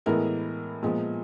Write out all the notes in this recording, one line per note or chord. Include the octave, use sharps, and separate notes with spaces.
A2 E3 G#3 B3 A#4
A#2 F3 G#3 B3